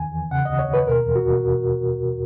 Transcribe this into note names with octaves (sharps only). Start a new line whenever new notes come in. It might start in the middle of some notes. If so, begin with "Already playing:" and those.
Already playing: E2 D#3 G#5
E2
C#3 F#5
D#2 D#5
C#5
D#2 B4
B2 A#4
E2
F#4
B2